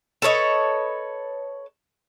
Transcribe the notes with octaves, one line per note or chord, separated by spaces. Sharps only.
A4 B4 C#5 D#5